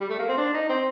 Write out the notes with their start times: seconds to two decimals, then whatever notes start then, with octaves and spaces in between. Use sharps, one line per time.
0.01 G3
0.10 A3
0.19 A#3
0.28 C4
0.37 D4
0.53 D#4
0.69 C4